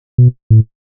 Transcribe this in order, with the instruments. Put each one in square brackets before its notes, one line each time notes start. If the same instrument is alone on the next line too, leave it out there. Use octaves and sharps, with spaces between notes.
[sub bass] B2
A2